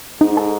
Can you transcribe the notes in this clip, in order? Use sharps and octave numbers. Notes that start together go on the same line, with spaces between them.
G#2 D#4
A4